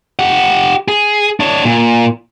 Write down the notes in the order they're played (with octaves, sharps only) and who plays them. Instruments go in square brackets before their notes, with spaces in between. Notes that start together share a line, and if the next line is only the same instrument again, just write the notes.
[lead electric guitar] G4 F#5
G#4
D4 C#5
A#2